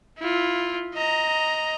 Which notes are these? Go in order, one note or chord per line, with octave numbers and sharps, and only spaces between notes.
E4 F4
D#5 A#5